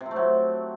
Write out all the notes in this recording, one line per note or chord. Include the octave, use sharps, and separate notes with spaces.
C3
C4
A3
F#3